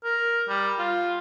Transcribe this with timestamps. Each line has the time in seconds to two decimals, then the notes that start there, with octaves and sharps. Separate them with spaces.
0.04 A#4
0.49 G3
0.79 F4